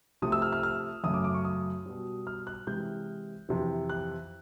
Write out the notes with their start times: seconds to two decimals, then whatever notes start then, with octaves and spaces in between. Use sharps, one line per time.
0.22 C3 F3 A3 D#6
0.32 E6
0.42 F6
0.53 F6
0.63 F6
1.04 F#2 C#3 F#3 A3 D#6
1.14 D6
1.24 D6
1.34 C#6
1.45 D#6
1.86 B2 G3
2.27 F6
2.47 F#6
2.67 C3 E3 G#3 G6
3.49 F2 C3 E3
3.89 F#6